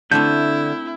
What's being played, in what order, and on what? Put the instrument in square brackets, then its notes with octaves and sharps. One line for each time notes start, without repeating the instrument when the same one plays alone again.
[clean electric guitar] D3 [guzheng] A3 C4 D4 [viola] E4 [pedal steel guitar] G6